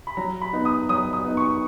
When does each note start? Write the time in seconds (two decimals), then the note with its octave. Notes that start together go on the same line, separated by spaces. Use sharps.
0.07 B5
0.17 F#3 A#5
0.42 B5
0.53 B3 D#4
0.65 D#6
0.89 F#3 D#6
1.13 D#6
1.24 B3 D#4
1.37 C#6